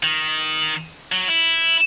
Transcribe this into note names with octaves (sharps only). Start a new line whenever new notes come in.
D#3
F#3
E4